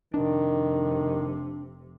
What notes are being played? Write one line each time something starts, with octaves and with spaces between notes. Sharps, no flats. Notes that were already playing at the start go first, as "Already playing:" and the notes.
F1 C3 D#3 D4